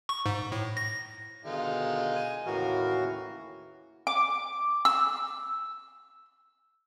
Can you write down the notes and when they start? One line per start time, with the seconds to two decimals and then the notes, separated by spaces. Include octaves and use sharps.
0.09 C#6
0.26 G#2
0.52 A2
0.77 A#6
1.45 B2 D3 D#3 G#3 D#4 F4
2.15 G#5
2.46 D#2 A2 C#3 E3 F#4 A#4 F5
4.07 D6
4.85 E6